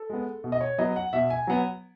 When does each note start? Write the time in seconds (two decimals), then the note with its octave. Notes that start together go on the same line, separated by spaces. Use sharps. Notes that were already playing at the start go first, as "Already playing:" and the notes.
Already playing: A4
0.10 G#3 B3
0.44 B2
0.52 D#5
0.61 C#5
0.78 F#3 B3 D#5
0.96 F#5
1.13 B2 E5
1.30 G#5
1.47 F#3 B3